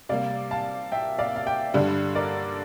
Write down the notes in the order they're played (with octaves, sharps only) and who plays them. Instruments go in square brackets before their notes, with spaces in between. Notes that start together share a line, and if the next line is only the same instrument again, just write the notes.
[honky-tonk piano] C3 G3 A#3 [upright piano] D5 F5
[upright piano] F5 A5
E5 G5
D5 F5
F5
E5 G5
[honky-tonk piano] G2 D3 G3 D4
[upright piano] A#4 D5